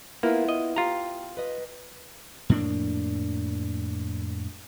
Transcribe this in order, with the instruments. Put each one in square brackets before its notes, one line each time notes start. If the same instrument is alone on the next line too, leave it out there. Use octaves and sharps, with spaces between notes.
[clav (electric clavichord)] A#3 [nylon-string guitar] B3 E4 F4
[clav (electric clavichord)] D#5
[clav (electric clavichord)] F4 A#5 [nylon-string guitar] G4
[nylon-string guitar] B4 D#5
[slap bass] F2 A2 A#3 D4